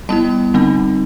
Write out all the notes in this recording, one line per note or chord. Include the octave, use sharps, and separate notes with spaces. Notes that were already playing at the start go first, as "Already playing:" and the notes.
G3 B3 E4 A5
D3 G3 C4 D#4